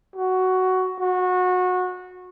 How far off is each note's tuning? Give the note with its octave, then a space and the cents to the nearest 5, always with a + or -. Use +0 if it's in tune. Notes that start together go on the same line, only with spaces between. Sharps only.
F#4 +10
F#4 -25